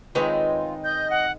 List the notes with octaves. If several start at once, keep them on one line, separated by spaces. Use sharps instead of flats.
D#3 G#3 C4 D#4 F4 B4 C#5
D#5 G6
F#5